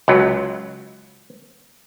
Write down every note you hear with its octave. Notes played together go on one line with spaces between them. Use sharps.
C#2 F#3